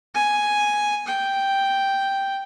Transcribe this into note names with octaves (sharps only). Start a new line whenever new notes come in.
G#5
G5